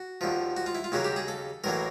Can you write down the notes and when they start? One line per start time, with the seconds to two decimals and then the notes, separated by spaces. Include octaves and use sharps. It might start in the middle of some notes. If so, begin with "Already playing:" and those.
Already playing: F#4
0.21 D#2 D3 F3
0.57 F#4
0.66 F4
0.75 E4
0.84 F4
0.92 D#2 C#3 F#3 A#3 F#4
1.04 G4
1.16 G#4
1.28 A4
1.64 A1 A2 F#3 A#3 A#4